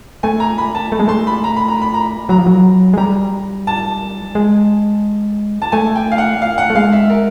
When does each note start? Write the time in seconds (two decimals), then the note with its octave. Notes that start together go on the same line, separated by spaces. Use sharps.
0.23 A3 G#5
0.40 A#5
0.58 B5
0.75 A5
0.92 A3
1.00 G#3
1.08 A3 C6
1.27 B5
1.44 A#5
1.56 B5
1.68 A#5
1.82 B5
1.94 A#5
2.29 F#3 A#5
2.38 F3
2.46 F#3
2.93 G#3
2.97 G3 A#5
3.67 A5
4.35 G#3
5.62 A5
5.72 A3 G#5
5.95 G5
6.12 F5
6.18 F#5
6.42 F5
6.58 F#5
6.70 A3
6.75 G#3 F5
6.92 E5
7.10 A#4